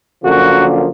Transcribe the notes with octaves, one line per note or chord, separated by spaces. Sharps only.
F#2 D3 F3 A#3 F#4